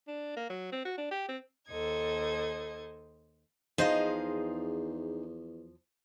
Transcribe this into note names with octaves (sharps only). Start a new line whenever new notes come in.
D4
A#3
F#3
C4
F#4
D4
G4
C4
D#2 A4 C5 D#5 G#6
E2 F3 D#4 G#4 C5 D#5 F5